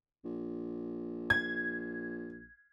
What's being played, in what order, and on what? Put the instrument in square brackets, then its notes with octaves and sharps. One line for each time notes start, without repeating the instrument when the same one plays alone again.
[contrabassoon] A#1
[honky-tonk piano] G#6